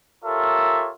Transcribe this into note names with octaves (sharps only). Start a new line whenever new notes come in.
F4 G4 A4 A#4 C#5 E5